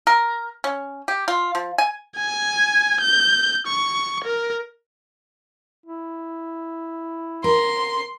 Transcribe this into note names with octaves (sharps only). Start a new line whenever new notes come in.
A#4
C#4
G4
F4
F3
G#5
G#5
G6
C#6
A#4
E4
A#4 C6